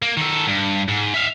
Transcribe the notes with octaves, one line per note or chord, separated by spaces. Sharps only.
A#3
D#3 A4
G2
G#2
E5 F5